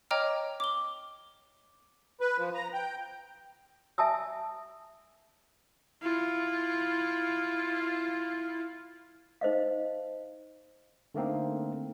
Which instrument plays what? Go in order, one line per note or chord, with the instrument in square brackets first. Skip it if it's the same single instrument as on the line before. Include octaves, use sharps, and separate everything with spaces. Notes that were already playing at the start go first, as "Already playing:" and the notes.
[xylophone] C#5 D#5 G5 A#5 D6 F6
D6 G7
[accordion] B4
F3
A#5
G5
[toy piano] E5 G#5 A5 D#6 E6
[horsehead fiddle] E4 F4
[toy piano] D#4 C5 D#5 F5
[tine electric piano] D3 A3 A#3 C4 D#4